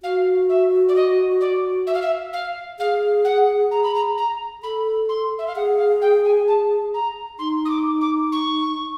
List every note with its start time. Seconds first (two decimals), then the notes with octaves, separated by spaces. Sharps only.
0.03 F#4 F5
0.49 E5
0.89 D5
0.95 D#5
1.41 D5
1.87 E5
1.94 F5
2.02 E5
2.33 F5
2.79 G#4 F5
3.25 F#5
3.71 A#5
3.83 B5
3.95 A#5
4.18 A#5
4.63 A4 B5
5.09 C6
5.39 E5
5.47 F5
5.56 G#4 F#5
5.78 F5
6.02 G5
6.25 G#5
6.48 A5
6.94 A#5
7.39 D#4 C6
7.65 D#6
7.70 D6
8.01 D6
8.32 C#6